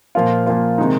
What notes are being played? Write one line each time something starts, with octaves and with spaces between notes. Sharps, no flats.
A#2 F3 A#3 F4
A#2 F3 A#3 F4
C3 D#3 G#3 D#4